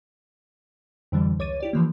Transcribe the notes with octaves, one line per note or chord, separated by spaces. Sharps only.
F2 D3 E3 G3
C#2 C#5 D6 A6 D#7
E4 G4 D5
D3 E3 F3 A#3